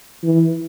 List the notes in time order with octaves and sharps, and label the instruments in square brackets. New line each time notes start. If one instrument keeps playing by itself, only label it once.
[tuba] E3